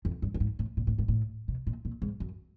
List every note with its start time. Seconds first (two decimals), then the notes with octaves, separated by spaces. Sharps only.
0.05 F2
0.22 G2
0.34 G2
0.40 G#2
0.59 A2
0.77 A#2
0.87 A2
0.98 G#2
1.08 A2
1.48 B2
1.67 A#2
1.85 A#2
2.02 G#2
2.20 F#2